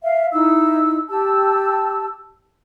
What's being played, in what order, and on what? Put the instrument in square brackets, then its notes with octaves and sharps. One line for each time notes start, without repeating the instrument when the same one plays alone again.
[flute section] E5 F5
D#4 E4 E6
G4 A5 E6